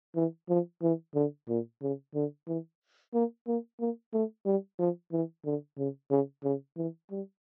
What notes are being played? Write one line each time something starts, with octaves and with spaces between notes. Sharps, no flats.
E3
F3
E3
D3
A#2
C#3
D3
E3
A#3
A#3
A#3
A3
G3
F3
E3
D3
C#3
C#3
C#3
E3
G3